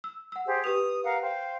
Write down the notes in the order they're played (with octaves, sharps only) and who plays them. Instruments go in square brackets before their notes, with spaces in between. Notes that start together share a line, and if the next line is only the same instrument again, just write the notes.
[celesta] E6
F#5 E6
[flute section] G4 G#4 C5
[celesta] G4 B4 F7 [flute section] D#6
[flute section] A#4 F5 F#5
C5 F5 G5